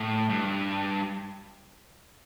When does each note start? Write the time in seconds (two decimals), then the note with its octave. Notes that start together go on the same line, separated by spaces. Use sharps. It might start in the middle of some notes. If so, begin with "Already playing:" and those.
Already playing: A2
0.30 G2